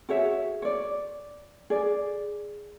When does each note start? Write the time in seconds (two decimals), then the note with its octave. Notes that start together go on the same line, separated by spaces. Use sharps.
0.09 F#4 G#4 C#5 E5
0.62 C#5 D5
1.70 G#4 D5